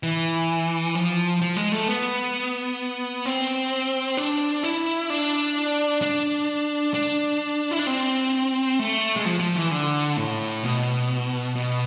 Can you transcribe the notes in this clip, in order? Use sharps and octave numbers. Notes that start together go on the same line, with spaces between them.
E3
F3
F3
G#3
A3
B3
C4
D4
E4
D4
D4
D4
E4
D4
C4
A3
G#3
F3
F3
E3
D3
A2
B2
B2